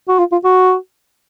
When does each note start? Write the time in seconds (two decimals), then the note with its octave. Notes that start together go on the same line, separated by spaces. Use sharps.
0.08 F#4
0.19 F4
0.32 F4
0.44 F#4